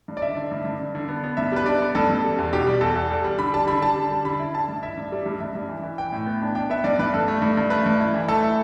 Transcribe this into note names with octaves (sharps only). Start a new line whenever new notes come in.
G2
D5
D3 E5
D3
G2
G2
G2
D3
B3
B3
G2 E5
G3 B4
D4 D5
B3
G2 A4
G2
G3
E2
B2 G4
G3
E2 A4
E2
G3
G3
D3 B5
G3 A5
D3 B5
G3 A5
D3
G3
D3 B5
E4
E4 A5
G2
E4 E5
G2
G3
G2
G2 E5
G2
E3
E3
E3 G5
A2
B3
D4
D4 G5
B3 E5
G2 D5
G2 B4
G2 A4
A3
G2
G2
A3 B4
G2
E4
E3
A3 A4
E4